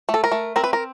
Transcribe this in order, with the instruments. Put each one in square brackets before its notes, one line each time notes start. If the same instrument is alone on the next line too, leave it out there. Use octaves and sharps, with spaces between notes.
[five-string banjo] A3
A4
A#4
A3
C4 A#4
B4
A#4